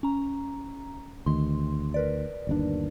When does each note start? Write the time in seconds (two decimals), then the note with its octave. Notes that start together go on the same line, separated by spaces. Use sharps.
0.03 C#4 A#5
1.26 D2 D#3 C6
1.94 A#4 B4 D5
2.47 G1 D#2 D4